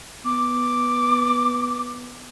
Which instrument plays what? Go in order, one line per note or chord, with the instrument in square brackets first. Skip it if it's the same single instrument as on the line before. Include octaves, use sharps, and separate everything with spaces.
[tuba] B3 [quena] D6